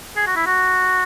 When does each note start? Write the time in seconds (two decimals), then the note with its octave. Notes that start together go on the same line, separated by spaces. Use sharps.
0.16 G#4
0.27 F#4
0.36 E4
0.46 F#4